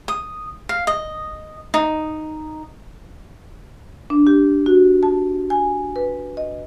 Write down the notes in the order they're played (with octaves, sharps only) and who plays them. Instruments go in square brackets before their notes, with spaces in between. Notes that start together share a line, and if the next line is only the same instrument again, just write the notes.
[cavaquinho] D#6
F5
D#5
D#4
[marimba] D4
G4
F#4
A5
G#5
B4
D#5